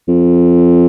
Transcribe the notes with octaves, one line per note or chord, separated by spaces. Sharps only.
F2